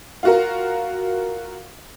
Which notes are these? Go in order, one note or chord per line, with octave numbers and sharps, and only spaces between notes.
F4 F#4 A#4